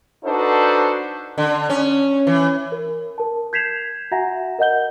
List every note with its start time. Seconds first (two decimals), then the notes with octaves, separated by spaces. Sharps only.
0.24 D4 D#4 F#4 A4 B4 C5
1.38 D3
1.70 C#4
2.27 E3
2.72 A#4
3.18 A#4 A5
3.53 G6 G#6 B6 C7 E7 F7
4.11 F#4 E5 F#5 G#5 A#5 A#6
4.59 A#4 D#5 F#5 G6 G7